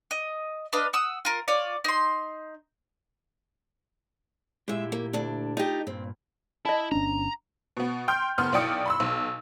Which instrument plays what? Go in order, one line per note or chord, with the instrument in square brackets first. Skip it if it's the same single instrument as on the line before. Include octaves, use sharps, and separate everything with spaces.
[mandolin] D#5
D4 B4 D#5 F5
F#5 D#6 E6
F4 A#4
F4 C#5 D5
D#4 C6
[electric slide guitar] A#2 E4 G4 [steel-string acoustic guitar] G#3 E5
[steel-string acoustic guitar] A#3
D2 D4
[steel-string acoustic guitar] D#4 G4 [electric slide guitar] F4 D#5
[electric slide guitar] G2 A#2 [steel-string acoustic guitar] C4
[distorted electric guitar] E4 [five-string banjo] D#5 A5
[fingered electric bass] G1 C#4 D4 [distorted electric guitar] A#5
[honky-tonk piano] B2 B3
G5 C6 F6 G6
F#1 B3 C6 F6
B1 E4 D5 G5 D#6 C#7
B5 C6 E6
B1